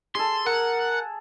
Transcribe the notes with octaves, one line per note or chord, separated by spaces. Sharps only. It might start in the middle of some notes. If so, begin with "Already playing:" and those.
G#4 A4 C6
A#4 F#5